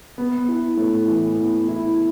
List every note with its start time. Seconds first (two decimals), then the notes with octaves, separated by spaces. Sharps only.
0.18 B3
0.48 E4
0.77 A2
1.08 E3
1.37 B3
1.68 E4